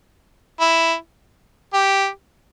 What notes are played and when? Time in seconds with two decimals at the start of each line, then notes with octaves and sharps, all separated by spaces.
0.60 E4
1.74 G4